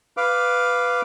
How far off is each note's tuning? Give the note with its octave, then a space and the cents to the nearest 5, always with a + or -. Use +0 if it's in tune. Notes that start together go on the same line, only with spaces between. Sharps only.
B4 +5 F5 +0 D6 +0